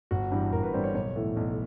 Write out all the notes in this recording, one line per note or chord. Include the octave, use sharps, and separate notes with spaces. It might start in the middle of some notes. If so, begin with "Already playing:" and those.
G1 F#4
G2 E3 G3
G1 A#4
B4
G2 E3 G3 C5
C#5
B1 C#5
A2 E3 A3
B1